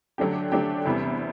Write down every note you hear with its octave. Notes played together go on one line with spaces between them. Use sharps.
D3 F#3 A3 D4 G4
D3 F#3 A3 D4 G4
E2 C3 E3 G3